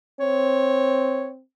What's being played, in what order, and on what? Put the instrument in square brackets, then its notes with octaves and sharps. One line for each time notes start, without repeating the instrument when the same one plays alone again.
[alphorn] C4 [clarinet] C#5